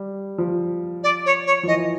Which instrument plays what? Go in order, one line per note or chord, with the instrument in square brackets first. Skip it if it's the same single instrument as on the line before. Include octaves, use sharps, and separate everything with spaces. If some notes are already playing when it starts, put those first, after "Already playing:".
Already playing: [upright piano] G3
F3
[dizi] D5
C#5
C#5
[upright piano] F3
[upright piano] E3 [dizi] D#5